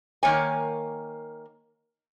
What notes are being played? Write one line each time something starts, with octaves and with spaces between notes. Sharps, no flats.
D#3 A#3 C#5 G#5